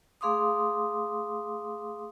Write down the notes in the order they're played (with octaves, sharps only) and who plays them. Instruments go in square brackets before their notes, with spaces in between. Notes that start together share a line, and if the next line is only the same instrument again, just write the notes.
[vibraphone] A3 G#4 F5 C6 D6 D#6